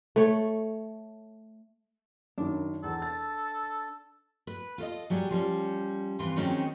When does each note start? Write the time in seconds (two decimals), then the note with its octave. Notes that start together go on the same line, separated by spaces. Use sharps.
0.16 A3 C#5
2.38 F#2 D#3 D4
2.84 E2 A4
3.02 A6
4.47 B4
4.78 F4 A4 C5 D#5
5.10 F#3 G3 G4 G#4
5.31 F3 G3 C#4
6.19 F2 E3 F4
6.36 D#3 F#3 G#3 C4 C#4 D#4